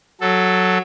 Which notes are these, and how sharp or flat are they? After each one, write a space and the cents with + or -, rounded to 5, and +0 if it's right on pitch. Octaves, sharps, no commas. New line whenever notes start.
F#3 +0 A4 +0